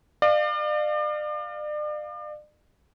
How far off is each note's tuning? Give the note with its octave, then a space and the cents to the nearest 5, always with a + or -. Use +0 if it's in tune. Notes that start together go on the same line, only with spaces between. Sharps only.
D5 +40 F5 +0